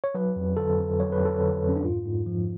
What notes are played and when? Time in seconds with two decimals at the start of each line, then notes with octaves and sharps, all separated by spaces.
0.04 C#5
0.15 F#3 B4
0.36 F2
0.57 D3 A4
0.78 F2
1.00 F#3 C#5
1.12 B4
1.20 F2
1.25 A4
1.38 D3 B4
1.63 F2
1.69 C#4
1.76 D4
1.84 G#2 F4
2.05 G#2
2.26 F3